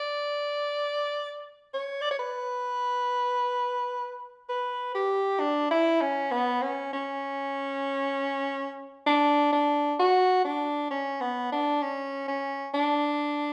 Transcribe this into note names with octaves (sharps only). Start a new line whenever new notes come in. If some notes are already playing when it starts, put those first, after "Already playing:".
Already playing: D5
C#5
D5
C#5
B4
B4
G4
D4
E4
C#4
B3
C#4
C#4
D4
D4
F#4
D4
C#4
B3
D4
C#4
C#4
D4